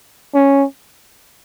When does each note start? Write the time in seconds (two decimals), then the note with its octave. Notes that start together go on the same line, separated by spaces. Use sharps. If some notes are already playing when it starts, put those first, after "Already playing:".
0.35 C#4